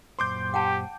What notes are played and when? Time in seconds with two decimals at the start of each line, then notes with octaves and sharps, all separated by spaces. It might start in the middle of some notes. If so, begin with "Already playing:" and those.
0.19 F#2 A#2 C5 C6 D6 G6
0.54 G4 F#5 G5 A5